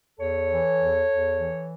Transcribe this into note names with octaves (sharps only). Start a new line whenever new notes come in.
E2 A4 C#5
E3
E2
E2
E3